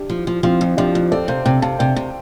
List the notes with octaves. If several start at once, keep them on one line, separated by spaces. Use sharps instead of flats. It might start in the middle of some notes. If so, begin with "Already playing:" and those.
Already playing: D4 G4
F3
F3
F3 C4 F4
F2
F3 D4 G4
F2
C4 A4 D5
C3 C5 F5
C3 D5 G5
C3 F5 A5
C3 D5 G5
C3